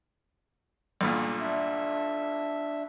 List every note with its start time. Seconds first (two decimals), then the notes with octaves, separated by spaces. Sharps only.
1.01 B1 G2 A#2
1.41 D4 E5